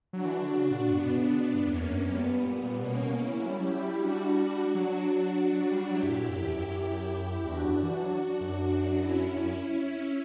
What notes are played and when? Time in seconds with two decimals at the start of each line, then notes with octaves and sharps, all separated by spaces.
0.13 F#3 D4 F#4
0.25 E3
0.38 D3
0.51 C#3
0.71 A#2
0.90 G2 B3 D4
1.06 B2
1.18 C#3
1.29 D3
1.41 B2
1.54 G2
1.66 E2 A#3 C#4
1.86 F#2
2.05 F#2 G3 B3
2.25 G2
2.44 A#2
2.63 A#2
2.82 B2 A#3 C#4
3.02 B2
3.21 C#3 C#4 E4
3.30 E3
3.39 F#3
3.49 G3
3.59 F#3 E4 G4
3.78 G3
3.98 D4 F#4
4.75 F#3 D4 F#4
5.13 D4 F#4
5.52 F#3
5.71 G3
5.90 F#3 E4 G4
6.03 G2
6.10 A#2
6.29 F#2 E4 G4
6.42 E2
6.54 F#2
6.68 F#2
7.44 E2 D4 F#4
7.63 F#2
7.83 E3
8.02 F#3
8.41 F#2
8.98 C#4 E4
9.36 F#2